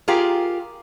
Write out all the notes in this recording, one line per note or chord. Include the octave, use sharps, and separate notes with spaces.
F4 G4 G#4 A#4